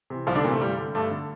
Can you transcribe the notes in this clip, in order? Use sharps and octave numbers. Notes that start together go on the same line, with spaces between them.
C3 E3
C2 F3 F4
D3 D4
A#2 C3 E3 A3 A#3
G2 G3
D3
G2 A3
D3